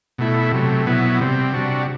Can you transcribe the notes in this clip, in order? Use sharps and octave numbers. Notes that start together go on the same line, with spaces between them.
B2 A3 E4
C3 F#3 A3
B2 F#3 B3 E4
C3 G3 C4
C3 G3 D4 F#4